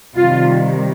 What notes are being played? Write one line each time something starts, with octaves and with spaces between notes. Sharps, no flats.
C3 D#3 G3 F4